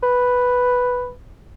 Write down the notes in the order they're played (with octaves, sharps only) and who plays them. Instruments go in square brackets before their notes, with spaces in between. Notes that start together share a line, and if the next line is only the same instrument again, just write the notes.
[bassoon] B4